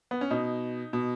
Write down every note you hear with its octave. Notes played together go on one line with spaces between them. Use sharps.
B3
C#4
B2 D#4
B2